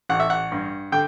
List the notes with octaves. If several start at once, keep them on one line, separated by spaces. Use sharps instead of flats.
A1 F#5
E5
F#5
G2
D3 G5